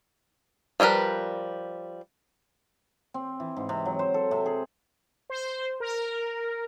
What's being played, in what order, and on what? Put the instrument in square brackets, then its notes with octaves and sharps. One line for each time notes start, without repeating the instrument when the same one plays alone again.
[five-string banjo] F3 G3 E4 A#4 B4
[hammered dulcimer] C4
E3
G#2
C3
F#3
C5
A4
C3
G#4
[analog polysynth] C5
A#4